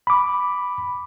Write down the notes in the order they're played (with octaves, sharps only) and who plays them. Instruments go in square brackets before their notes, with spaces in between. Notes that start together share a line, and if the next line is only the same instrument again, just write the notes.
[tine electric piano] B5 D6